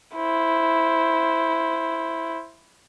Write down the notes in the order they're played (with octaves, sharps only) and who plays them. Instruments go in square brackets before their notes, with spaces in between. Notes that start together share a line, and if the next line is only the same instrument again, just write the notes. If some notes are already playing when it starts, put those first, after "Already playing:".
[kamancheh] E4 C5